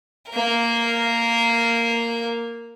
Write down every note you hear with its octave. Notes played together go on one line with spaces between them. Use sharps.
A#3 A#4